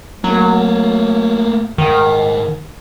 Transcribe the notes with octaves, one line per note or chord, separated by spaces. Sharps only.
F#3 A3 A#3
G#2 D#3 F#5